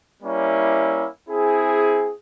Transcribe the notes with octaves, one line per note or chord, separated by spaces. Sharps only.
G3 A#3 C#4 E4
C4 E4 G#4